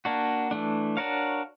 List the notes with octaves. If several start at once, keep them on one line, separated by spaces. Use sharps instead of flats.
A#3 D4 F#4
E3 A3 D4
D4 F#4 A#4 C#5 F5